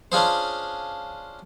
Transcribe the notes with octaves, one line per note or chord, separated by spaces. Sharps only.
C#4 D4 F4 G#4 C5